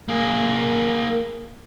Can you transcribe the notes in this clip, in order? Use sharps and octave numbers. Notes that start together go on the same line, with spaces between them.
A#3 G#4